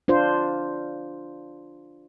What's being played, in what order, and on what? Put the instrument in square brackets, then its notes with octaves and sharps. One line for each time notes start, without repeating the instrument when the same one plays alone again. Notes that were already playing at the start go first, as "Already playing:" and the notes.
[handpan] D4 F4 C5